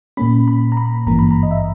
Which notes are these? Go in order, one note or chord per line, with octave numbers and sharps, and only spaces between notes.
A#2 A#3 C#4 B5
B5
A#5
B5
G#1 G2 E3 A#3 A#5
B5
A#5
D#5
E5